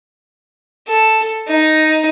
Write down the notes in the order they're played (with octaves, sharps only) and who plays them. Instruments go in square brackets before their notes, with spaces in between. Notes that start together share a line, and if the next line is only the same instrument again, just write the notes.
[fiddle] A4
D#4